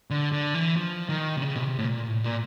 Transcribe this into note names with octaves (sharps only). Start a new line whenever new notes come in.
D3
D3
E3
F3
D#3
C3
C#3
B2
C3
A2
A#2
A2
A#2